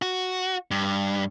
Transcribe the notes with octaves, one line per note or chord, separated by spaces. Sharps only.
F#4
G2